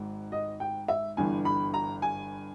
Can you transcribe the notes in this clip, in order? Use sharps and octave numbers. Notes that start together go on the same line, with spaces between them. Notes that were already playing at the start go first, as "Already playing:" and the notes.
Already playing: G#1 G#2
D#5
G5
E5
G1 G2 E3 G#5
B5
A#5
G#5